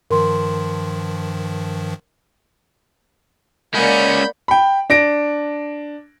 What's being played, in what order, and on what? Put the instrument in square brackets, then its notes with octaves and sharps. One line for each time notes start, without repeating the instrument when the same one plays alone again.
[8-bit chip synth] G2 D#3 F3 [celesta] A#4 C6
[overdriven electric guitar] G#3 C#4 [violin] A#3 C#7 [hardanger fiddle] D5 F#5 [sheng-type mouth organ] B5 G6
[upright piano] G5 B5
D4 A#6 D7